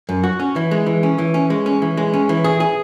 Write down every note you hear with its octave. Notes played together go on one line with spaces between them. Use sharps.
F#2
F#4
C#4
E3
G#3
E3
C#4
E3
C#4
G#3
C#4
E3
G#3
C#4
E3
G#4
G#4